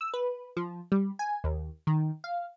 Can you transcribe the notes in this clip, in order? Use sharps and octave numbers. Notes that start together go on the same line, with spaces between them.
E6
B4
F3
G3
G#5
D#2
D#3
F5